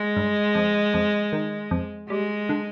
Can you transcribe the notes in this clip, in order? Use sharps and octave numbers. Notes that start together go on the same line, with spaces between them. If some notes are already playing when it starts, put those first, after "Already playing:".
Already playing: G#3
G2
F2
F2
D#3
F2
G3 G#3
D3